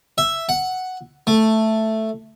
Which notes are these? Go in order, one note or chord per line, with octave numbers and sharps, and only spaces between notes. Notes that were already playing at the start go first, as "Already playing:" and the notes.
E5
F#5
A3